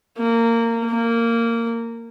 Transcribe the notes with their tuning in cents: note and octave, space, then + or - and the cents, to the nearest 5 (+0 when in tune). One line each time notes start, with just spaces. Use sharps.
A#3 -20
A#3 -15